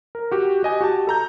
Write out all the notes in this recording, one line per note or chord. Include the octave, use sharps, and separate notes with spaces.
A#4
F#4 G4
G4 D#5 G#5
F#4 G4 A5
A4 A#5 G6